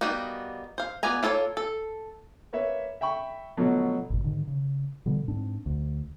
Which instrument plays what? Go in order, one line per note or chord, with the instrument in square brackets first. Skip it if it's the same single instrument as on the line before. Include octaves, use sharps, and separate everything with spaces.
[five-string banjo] G3 A#3 B3 D#4 F#4
C5 F5
B3 F4 D5 G#5 A#5
A#3 F4 A4 C5 C#5
A4
[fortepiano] A#3 B4 C#5 E5
E5 G5 B5 C#6
B2 D3 F3 F#3 A3 B3
[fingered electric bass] G#1 F2 B2
G#2 D3 D#3
C#3
B2 D3 E3 G3
G#2 C4 D4
D2